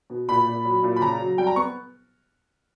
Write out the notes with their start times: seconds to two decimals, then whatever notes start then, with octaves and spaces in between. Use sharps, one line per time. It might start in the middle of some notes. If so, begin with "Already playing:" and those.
0.10 B2
0.29 A#2 B5
0.47 A#2
0.65 F#3
0.83 A#2
0.96 B5
1.01 C#3 A#5
1.20 F#3
1.38 G3 G5
1.47 A#5
1.56 B3 C#6